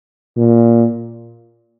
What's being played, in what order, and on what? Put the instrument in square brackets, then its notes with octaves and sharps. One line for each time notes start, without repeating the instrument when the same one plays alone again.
[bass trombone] A#2